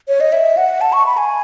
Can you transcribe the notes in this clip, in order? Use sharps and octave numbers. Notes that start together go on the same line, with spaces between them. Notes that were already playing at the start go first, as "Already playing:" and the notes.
C#5
D#5
E5
F#5
A5
C#6
B5
G#5